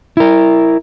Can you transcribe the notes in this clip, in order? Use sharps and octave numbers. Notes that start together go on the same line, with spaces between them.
E4 A#4